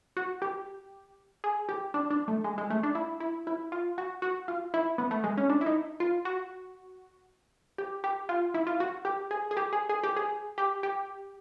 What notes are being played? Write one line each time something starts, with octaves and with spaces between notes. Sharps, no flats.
F#4
G4
G#4
G4
D4
D4
A3
G#3
G#3
A3
D4
E4
E4
E4
F4
F#4
F#4
F4
E4
B3
A3
G#3
C#4
D4
E4
D#4
F4
F#4
G4
G4
F4
E4
F4
F#4
G4
G#4
G#4
G4
G#4
G#4
G4
G#4
G4
G4